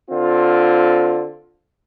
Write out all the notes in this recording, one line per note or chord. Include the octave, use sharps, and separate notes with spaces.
D3 C4 F4